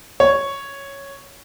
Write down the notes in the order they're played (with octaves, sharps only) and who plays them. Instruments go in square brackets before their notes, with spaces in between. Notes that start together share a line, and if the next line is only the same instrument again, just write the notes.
[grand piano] C#5